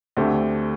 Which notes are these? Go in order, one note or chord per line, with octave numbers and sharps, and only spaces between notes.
D2 D3 A3 C4 G4